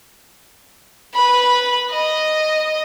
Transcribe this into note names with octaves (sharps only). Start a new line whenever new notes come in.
B4 B5
D#5